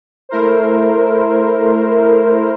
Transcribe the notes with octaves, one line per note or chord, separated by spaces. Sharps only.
A3 E4 A#4 C5